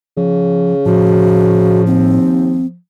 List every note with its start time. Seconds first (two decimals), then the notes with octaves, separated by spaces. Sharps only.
0.17 C#3 F3
0.86 A2 F3 F#4
1.86 D#2 C4